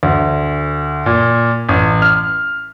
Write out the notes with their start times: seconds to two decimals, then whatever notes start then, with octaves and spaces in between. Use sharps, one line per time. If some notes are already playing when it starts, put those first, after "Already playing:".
0.03 D2
1.06 A#2
1.69 A1
2.02 F6